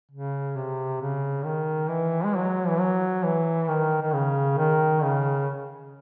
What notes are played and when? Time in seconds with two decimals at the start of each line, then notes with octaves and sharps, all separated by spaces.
0.11 C#3
0.56 C3
1.01 C#3
1.45 D#3
1.90 E3
2.25 G#3
2.35 F#3
2.68 E3
2.80 F#3
3.24 E3
3.69 D#3
4.02 D#3
4.14 C#3
4.58 D#3
5.03 C#3